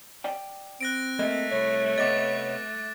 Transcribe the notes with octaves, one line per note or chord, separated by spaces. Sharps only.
D5 G5
C4 F#6 A#6 D7
A3 A#3 A#4 D#5
C2 C#5
C3 B3 D#5 D6 A6